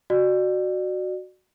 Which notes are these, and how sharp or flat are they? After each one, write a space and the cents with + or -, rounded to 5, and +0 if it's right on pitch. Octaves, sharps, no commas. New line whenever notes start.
F#4 +0 D5 +35